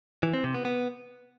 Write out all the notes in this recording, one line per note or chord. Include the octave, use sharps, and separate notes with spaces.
E3
C4
C3
B3
B3